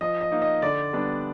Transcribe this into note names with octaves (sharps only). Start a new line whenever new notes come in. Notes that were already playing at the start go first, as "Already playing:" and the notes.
F3 D#5
D#5
A#3 D#4
D#5
D3 D5
G3 B3 D4